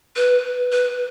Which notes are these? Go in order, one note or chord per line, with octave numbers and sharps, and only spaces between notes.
B4
B4